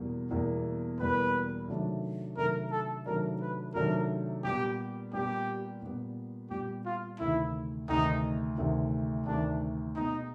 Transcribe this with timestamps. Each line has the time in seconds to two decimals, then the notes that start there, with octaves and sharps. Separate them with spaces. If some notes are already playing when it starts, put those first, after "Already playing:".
Already playing: E2 B2 G3 A#3
0.31 E2 B2 G3 A#3
0.99 E2 B2 G3 A#3 B4
1.68 C3 D#3 F#3 A3 D4
2.37 C3 D#3 F#3 A3 D4 A#4
2.71 A4
3.06 C3 D#3 F#3 A3 D4 A#4
3.41 B4
3.75 C3 D#3 F#3 A3 D4 A#4
4.44 A#2 G3 B3 G4
5.13 A#2 G3 B3 G4
5.82 A#2 G3 B3
6.50 A#2 G3 B3 G4
6.85 F4
7.19 D2 C3 D#3 E4
7.89 D2 C3 D#3 D#4
8.57 D2 C3 D#3
9.26 D2 C3 D#3 D4
9.95 B2 G#3 B3 D#4